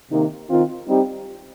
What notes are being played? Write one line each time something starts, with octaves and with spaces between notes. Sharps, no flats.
C3 D#3 A#3 D#4
D#3 C4 F4
G3 C4 D#4 G4